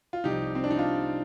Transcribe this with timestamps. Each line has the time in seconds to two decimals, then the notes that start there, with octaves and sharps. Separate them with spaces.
0.13 F4
0.24 C2 C3 F3 D#4 G4
0.55 C4
0.64 D4
0.71 D#4
0.78 D4 F4